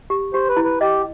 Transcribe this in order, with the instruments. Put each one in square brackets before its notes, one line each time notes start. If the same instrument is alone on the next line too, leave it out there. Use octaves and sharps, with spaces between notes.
[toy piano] G4
[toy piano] G4 [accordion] C5
[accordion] B4
[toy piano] E4
[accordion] B4
[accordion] G4 [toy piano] D#5